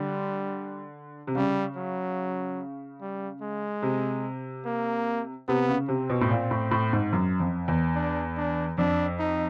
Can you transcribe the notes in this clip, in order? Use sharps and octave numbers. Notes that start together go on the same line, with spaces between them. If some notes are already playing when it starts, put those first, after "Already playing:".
Already playing: D3 G3
C3
C#3 G3
F#3
G3
G#3
C3
A#3
C3 B3
C#3
C3 C4
B2
A2
A#2
A2
A2
G#2
F#2
F2
E2
D4
D4
F2 D4
D#4